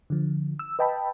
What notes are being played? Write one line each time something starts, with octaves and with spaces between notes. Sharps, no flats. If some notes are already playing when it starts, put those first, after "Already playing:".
D3 F3
E6
B4 D#5 G5 A5 B5